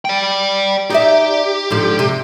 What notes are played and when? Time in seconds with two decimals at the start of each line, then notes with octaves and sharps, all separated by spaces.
0.05 D5 G5
0.90 D#4 G4 D5 E5
1.70 G#2 D3 F3
1.99 C3